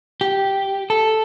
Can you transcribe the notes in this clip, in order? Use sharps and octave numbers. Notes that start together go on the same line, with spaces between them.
G4
A4